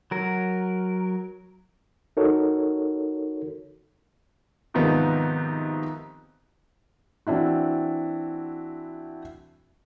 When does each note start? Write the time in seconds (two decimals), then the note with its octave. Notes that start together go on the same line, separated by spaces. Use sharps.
0.11 F#3 A#4
2.17 D#4 F#4 A4 A#4 C#5
4.74 G#2 C3 D#3 F3 B3 D#4
7.27 E3 C4 D4 E4 F#4